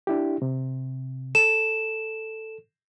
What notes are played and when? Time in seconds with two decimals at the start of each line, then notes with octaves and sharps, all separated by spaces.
0.07 D4 E4 G4
0.42 C3
1.35 A4 E7